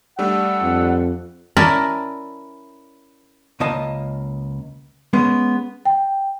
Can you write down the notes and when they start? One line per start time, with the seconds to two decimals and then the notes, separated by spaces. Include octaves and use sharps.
0.19 G3 A3 D4 F#5 E6
0.62 F2
1.57 C#4 E4 A#4 D5 G#5 A5
3.60 C#2 A#3 D#5 A5
5.13 G#3 B3 C#4
5.85 G5